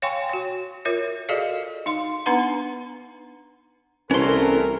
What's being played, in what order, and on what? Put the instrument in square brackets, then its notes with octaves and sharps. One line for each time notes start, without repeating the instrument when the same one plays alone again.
[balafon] C#5 F5 G5 G#5 C6 C#6
F#4 C#5
F4 A#4 C#5 E5
F#4 G#4 A4 D5 D#5 F5
D#4 F5 C6
B3 D4 D#4 B4 F#5 A#5
[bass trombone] C2 [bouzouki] E3 A3 [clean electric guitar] C#4 C6 [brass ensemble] A4 A#4